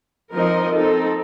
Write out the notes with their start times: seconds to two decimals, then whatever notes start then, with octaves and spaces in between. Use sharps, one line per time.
0.33 F3 C4 D#4 A#4 D#5
0.73 C4 D#4 A4